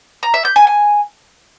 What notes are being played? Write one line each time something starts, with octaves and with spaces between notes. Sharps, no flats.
A#5
E5
G6
G#5
G#5